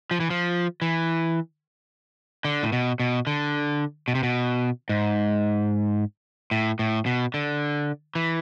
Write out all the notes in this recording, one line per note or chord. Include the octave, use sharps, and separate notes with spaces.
F3
E3
F3
E3
D3
A2
B2
B2
D3
B2
C3
B2
G#2
A2
A2
B2
D3
E3